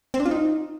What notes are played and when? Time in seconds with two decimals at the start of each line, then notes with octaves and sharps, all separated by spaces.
0.14 C4
0.20 D4
0.25 F4
0.31 D#4